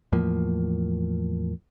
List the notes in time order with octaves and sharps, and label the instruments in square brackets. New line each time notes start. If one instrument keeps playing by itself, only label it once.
[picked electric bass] E2 A2 F3 A#3